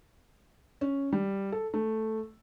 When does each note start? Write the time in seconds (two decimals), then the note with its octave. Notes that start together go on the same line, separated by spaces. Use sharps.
0.81 C#4
1.13 G3
1.52 A4
1.74 A3